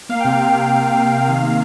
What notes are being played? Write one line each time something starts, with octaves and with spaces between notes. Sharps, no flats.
A#3 F5
C3 G5
F5
C3
C3
A#3
C3
A#3
C3
D#3 F5
A#3